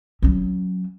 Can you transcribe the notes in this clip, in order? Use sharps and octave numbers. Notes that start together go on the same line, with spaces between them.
F#3 C#4